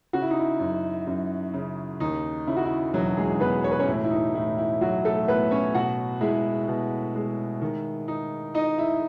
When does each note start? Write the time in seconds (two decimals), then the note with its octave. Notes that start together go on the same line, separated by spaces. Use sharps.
0.13 C#3 F#4
0.22 E4
0.31 D#4
0.40 E4
0.60 F#2
1.07 F#2
1.54 C#3
2.00 D#2 D#4
2.47 C#3 E4
2.57 F#4
2.65 E4
2.94 E1 F#3 F#4
3.17 G#3 G#4
3.40 E1 B3 B4
3.64 C#5
3.71 B4
3.80 C#4 C#5
3.87 A2 E4
4.04 E4
4.11 D#4
4.34 A2 E4
4.58 E4
4.81 F#3 F#4
5.05 A3 A4
5.28 A2 B3 B4
5.51 C#4 C#5
5.74 B2 F#4 F#5
6.21 G#3 E4 E5
6.68 B2
7.15 G#3
7.62 D#3
8.08 D#4
8.54 D#4 D#5
8.78 E4 E5